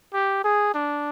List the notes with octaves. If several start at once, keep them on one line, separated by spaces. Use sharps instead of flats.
G4
G#4
D4